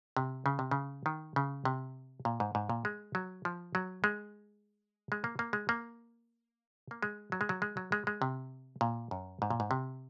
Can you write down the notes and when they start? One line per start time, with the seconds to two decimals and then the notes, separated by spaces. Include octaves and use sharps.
0.17 C3
0.46 C#3
0.59 C3
0.71 C#3
1.06 D#3
1.36 C#3
1.65 C3
2.25 A#2
2.40 G#2
2.55 G#2
2.70 A#2
2.85 G#3
3.15 F#3
3.45 F3
3.75 F#3
4.04 G#3
5.12 G#3
5.24 A#3
5.39 A#3
5.53 G#3
5.69 A#3
6.91 A#3
7.03 G#3
7.32 F#3
7.41 G#3
7.49 F#3
7.62 G#3
7.77 F#3
7.92 G#3
8.07 G#3
8.22 C3
8.81 A#2
9.11 F#2
9.42 G#2
9.50 A#2
9.60 G#2
9.71 C3